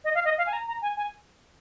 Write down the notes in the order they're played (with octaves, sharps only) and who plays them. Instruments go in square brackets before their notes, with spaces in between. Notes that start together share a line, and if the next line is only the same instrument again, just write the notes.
[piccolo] D#5
F5
D#5
F5
G#5
A#5
A#5
G#5
G#5